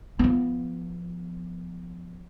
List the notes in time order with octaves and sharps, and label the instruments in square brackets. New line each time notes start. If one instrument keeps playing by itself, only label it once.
[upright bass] F3 B3